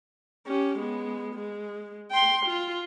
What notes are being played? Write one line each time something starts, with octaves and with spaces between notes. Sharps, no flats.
C#4 G4
G#3 B3
G#3
G5 C6
F4